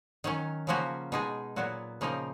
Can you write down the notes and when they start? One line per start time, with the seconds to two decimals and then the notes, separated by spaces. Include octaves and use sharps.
0.24 D#3 F#3 C#4
0.67 C#3 F3 A#3 C#4 F#4
1.12 B2 G#3 D#4 G#4
1.56 A#2 F#3 B3 F#4
2.01 C#3 F3 A#3 D#4 A#4